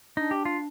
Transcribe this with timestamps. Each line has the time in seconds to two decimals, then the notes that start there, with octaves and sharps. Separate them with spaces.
0.17 D4 D#4
0.31 G4
0.45 F4